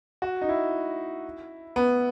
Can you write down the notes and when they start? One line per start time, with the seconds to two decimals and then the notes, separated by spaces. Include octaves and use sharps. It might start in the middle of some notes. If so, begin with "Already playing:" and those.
0.22 F#4
0.42 D#4
0.49 E4
1.76 B3